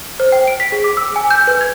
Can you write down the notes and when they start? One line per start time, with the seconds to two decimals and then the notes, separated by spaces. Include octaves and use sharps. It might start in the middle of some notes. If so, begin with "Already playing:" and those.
0.20 C5
0.32 G5
0.47 D7
0.60 B6
0.72 G#4
0.84 D6
0.97 E6
1.16 G#5
1.30 G6
1.47 B4
1.61 G#6